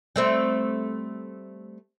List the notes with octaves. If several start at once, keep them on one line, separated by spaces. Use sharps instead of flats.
G3 A3 C4